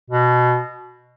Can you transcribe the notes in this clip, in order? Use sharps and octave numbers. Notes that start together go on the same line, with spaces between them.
B2